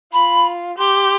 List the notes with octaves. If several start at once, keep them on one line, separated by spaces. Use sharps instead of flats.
F4 B5
G4 C6